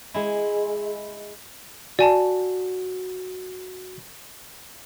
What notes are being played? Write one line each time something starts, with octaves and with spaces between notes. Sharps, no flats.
G#3 E4
F#4 D5 G#5 A5